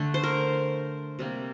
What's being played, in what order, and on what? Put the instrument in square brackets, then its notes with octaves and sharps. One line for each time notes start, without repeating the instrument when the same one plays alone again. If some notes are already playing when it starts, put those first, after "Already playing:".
Already playing: [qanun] D3 A3
C5
A#4
C3 G3 A#3